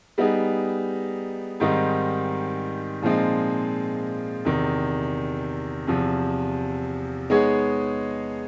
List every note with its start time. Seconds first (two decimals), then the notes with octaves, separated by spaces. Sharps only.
0.18 G3 B3 D#4 G#4
1.60 G#2 D#3 G3 C4 D#4
3.02 A#2 F3 G#3 C4 D#4
4.45 E2 C3 D#3
5.87 E2 C3 F3
7.30 G#3 B3 D#4 G#4 C#5